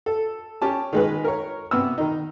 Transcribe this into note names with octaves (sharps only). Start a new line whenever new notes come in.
A4
C#4 G4 A5
D#3 G#3 B4
A#4 C#5
C3 B3 E6
D#3 D#4